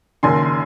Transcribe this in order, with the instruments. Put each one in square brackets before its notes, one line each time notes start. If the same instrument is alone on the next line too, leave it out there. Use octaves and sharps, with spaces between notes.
[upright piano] F#1 F#2 D#3 G#5 C6